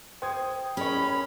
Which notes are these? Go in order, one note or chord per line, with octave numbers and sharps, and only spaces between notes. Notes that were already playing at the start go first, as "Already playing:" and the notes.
C5 G5 D#6 G#6
C#4 G#4 A#4 C#5 B5